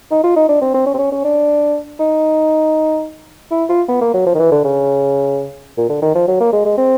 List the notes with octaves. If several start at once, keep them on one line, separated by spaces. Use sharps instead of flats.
D#4
F4
D#4
D4
C4
C4
C#4
C4
C#4
C#4
D4
D#4
E4
F4
B3
A#3
F#3
F3
D#3
E3
D3
C#3
A#2
D3
D#3
F3
F#3
A#3
G#3
G#3
C4